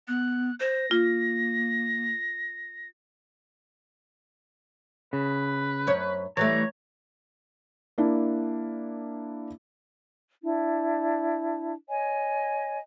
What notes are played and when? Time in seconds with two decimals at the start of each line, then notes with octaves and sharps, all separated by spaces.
0.08 B3 F#6
0.60 C5 A#6
0.91 A#3 F4
5.13 C#3 B4
5.87 F#2 C5 C#5
6.37 E3 G3 A3 C#5 A#5
7.98 A#3 D4 E4
10.43 D4 E4
11.89 C#5 D#5 G#5